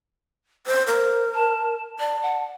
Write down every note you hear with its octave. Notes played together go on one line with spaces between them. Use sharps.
C5
A#4 C5
A5
D5 A5
F#5